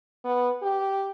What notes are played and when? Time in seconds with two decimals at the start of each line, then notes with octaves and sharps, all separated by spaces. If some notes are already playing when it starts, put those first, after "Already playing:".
0.25 B3
0.62 G4